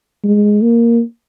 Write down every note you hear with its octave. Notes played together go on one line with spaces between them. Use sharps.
G#3
A#3